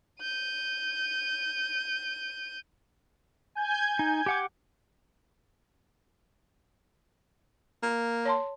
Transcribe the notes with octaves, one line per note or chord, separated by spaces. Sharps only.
G6 D#7
G#5 G6 G#6
D#4
G4 F#5 D6
A#3
C#5 A5 C6